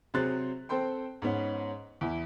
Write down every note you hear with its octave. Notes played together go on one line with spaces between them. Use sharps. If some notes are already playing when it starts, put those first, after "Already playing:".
C3 F#3 G#4 C5 F#6 A6
C4 A4 C5 G5 C6
G#2 B3 C#4
E2 E4